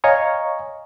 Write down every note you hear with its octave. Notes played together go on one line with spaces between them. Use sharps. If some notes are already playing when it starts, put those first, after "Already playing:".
C#5 D#5 F5 G#5 A#5 C#6